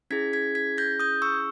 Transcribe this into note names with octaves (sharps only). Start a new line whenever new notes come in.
C#4 E4 G#4 G#6 B6
G#6 B6
G#6 B6
G6 A#6
D#6 G6
C#6 E6